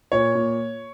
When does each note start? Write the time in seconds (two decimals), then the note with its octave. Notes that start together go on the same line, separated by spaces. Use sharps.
0.12 A#2 C#5
0.35 A#2